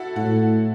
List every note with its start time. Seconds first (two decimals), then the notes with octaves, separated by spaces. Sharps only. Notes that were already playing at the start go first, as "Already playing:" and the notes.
Already playing: E4 F#4 A4
0.16 A2 F#4